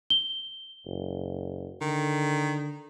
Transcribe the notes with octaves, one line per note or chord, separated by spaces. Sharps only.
G7
F#1
D3 D#3